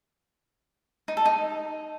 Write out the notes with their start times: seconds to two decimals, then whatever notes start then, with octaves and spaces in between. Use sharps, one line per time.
1.08 D#4
1.17 A4
1.26 D#4